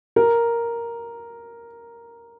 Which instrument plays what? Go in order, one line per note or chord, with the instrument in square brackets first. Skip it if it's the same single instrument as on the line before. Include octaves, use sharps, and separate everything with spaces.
[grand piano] A#4